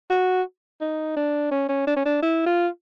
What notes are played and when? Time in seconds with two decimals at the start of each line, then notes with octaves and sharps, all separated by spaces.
0.10 F#4
0.81 D#4
1.17 D4
1.51 C#4
1.69 C#4
1.87 D4
1.97 C#4
2.06 D4
2.22 E4
2.46 F4